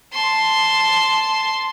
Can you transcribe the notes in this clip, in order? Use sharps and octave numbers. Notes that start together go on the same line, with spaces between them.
A5 C6